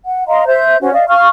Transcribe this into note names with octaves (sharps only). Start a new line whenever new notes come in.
F#5
D#5 F5 A#5 C6
C5 E5 G6
C#4 F#4 C5
D5 D#5 F5
F5 C#6 F6